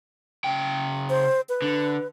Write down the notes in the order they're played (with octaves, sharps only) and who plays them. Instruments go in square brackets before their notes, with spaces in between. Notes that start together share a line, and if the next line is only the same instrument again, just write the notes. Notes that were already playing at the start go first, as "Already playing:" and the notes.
[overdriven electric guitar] C#3 G5
[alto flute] C5
B4
[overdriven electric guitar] D3